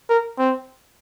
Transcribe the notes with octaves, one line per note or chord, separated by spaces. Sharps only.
A#4
C4